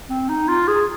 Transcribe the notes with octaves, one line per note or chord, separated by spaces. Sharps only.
C4
D#4
F4
G#4